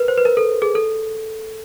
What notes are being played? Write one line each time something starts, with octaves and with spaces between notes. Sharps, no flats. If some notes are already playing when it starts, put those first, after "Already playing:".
Already playing: A#4 B4
C5
B4
A#4
A4
G#4
A4